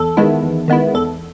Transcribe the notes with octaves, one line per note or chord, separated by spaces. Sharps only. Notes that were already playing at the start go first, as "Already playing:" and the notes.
Already playing: E2 A4
D#3 G#3 B3 E4
E2
D#3 G#3 B3 E4
E2 A4